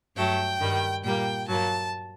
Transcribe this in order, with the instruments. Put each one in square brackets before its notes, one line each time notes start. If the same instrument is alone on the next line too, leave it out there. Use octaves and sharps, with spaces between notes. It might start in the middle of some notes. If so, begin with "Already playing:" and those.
[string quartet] G2 F#3 A3 G5
G2 D#3 G3
A#2 G3 A#3 G5
G2 F#3 A#3 A5